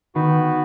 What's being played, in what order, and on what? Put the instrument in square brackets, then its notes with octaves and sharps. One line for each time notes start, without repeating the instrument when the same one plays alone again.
[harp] D#3 D#4 [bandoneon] B3 F#4 B4